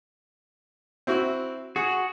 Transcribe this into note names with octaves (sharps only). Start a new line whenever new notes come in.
C4 E4 F#4
F#4 G#4